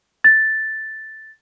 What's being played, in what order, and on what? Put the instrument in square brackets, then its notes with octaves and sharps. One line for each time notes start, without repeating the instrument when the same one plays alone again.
[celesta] A6